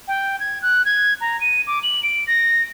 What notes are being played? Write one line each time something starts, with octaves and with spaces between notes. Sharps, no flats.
G5
G#6
F#6
G#6
A#5
D#7
D6
F#7
D7
A#6